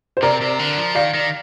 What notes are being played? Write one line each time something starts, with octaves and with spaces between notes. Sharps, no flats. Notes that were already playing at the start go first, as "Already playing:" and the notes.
C5
C3 A#4 D5
C3
D3
F3
D#3 D5 F5
D#3